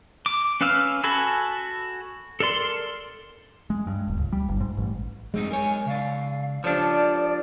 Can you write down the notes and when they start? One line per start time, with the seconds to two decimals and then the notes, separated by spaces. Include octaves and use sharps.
0.26 D6
0.61 C#4 B4 F5 E6 F6
1.04 F#4 A4 G#5 B5 E6
2.40 A4 A#4 D5 C6
3.70 G#3
3.87 G2
4.08 D1
4.19 C#2
4.32 G3
4.49 G1
4.60 G#2
4.77 A1
5.34 F#2 G#3 C4 D#4
5.51 A#4 C#5 G#5
5.86 C#3 D5 F5
6.64 F3 D4 G4 A4 C#5 D5